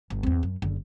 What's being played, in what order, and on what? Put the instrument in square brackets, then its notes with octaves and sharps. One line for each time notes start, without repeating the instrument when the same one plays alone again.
[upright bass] G1
E2 C4
F#2
F#1 D3